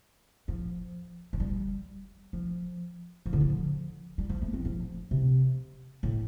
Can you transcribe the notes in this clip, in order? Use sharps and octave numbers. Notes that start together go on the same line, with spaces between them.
F3
F3
G3
F3
F3
D3
F3
G3
F3
A3
C4
F3
C3
A2